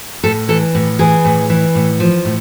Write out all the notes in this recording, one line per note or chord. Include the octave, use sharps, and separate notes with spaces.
A2 A4
E3 A4
A2
E3 G#4
A2
E3
A2
F3
A2